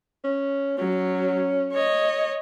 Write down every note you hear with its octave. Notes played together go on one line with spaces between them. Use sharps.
C#4
F#3 C#4
C#5 D#5